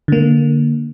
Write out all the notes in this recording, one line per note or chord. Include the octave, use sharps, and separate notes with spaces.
D3 A#3